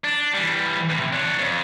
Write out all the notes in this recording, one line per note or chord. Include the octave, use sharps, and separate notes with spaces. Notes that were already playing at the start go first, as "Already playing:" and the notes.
D4
E3 G3
A2 C3
D4 C#5
F2